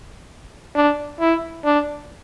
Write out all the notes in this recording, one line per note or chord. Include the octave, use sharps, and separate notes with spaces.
D4
E4
D4